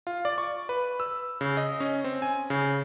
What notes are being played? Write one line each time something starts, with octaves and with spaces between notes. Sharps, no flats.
F4
D5
C#6
B4
E6
C#3
D#5
C#4
C4
G#5
C#3